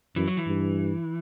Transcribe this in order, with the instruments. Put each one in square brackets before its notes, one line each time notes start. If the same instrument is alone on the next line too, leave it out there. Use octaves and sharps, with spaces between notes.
[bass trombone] F#2 [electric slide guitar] E3
[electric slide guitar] F#3
E3
[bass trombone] G2